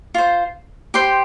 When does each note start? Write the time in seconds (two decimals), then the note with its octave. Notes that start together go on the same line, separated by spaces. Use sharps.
0.14 F4 C5
0.94 G4 C5 C6